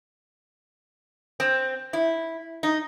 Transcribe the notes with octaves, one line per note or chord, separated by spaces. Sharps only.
C4
E4
D#4